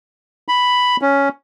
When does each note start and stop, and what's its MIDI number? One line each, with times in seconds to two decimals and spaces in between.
0.48 0.97 83
1.02 1.29 61